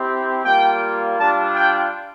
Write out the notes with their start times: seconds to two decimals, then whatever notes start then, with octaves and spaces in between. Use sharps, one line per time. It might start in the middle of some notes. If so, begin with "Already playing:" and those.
Already playing: C4 E4 G4
0.44 G3 A#3 F4 G5
1.18 G3 D4 F4 A5
1.55 G5